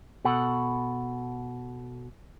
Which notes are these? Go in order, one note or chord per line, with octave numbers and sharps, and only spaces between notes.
B2 A4 F#5